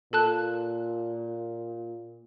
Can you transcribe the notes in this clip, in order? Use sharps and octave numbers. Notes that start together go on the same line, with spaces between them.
A#2 A4 A5 F#6